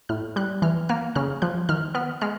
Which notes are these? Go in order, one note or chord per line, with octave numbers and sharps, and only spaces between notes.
A2 F6
G3 F#6
E3 F6
A#3 F6
C#3 F6
F3 F#6
D#3 F6
B3 F6
G#3 F6